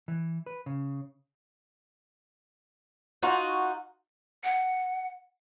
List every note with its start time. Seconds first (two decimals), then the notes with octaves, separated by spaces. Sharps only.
0.08 E3
0.46 B4
0.66 C#3
3.22 D#4 F4 F#4
4.44 F#5